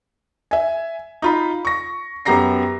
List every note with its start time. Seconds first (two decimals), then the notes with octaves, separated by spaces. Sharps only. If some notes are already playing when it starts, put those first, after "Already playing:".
0.51 E5 G#5
1.22 D#4 F4 B5
1.65 C#6 A#6
2.25 F#2 B3 G4 A#5 A#6 C7